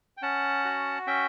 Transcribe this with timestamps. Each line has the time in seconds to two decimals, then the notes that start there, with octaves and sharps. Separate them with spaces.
0.17 G5
0.22 C#4 F#5 A5
0.65 F#4
1.07 C#4 E5 G5